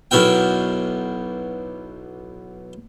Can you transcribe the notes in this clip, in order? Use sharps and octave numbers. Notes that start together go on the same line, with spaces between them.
B1 B2 E4 A#4 G5